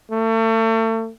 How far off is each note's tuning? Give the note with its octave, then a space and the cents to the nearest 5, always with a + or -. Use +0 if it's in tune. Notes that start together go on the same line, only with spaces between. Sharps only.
A3 +35